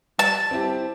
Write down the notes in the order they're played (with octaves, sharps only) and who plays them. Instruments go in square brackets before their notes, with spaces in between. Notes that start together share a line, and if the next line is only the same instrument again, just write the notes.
[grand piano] G3 [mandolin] A5
[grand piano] C4 E4 G4